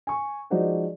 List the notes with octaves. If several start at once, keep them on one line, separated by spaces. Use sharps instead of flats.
G#5 C#6
F3 G#3 D#4 F#4 C5 D5